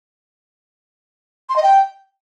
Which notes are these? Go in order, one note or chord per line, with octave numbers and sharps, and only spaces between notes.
C6
D#5
G5